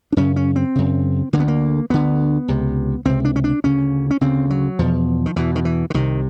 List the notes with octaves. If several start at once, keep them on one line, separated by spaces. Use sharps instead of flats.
D4
F#2 C#3 C#4
C#4
C4
F#2 C#3
D2 D3 A#3 B3
A#3
D2 D3 B3
C#2 C3
C#2 C3 C4
D4
C#4
D4
D2 C#3 C#4
C#4
D2 C#3 C4
F#3
E2 B2 F3
D#3
E2 B2 E3
D#3
E3
D3
C2 C3 D#3